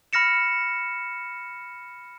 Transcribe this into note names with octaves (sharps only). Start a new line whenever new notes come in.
B5 F6 A#6 C#7 E7